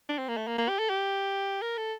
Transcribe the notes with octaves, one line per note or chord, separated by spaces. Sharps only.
D4
C4
A#3
A3
A#3
A#3
G4
A4
G4
A#4
A4